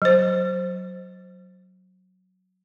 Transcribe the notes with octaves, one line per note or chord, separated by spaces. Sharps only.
F#3 C5